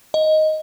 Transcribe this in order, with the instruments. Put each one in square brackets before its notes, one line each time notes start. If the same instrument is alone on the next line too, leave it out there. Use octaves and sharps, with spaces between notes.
[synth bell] D#5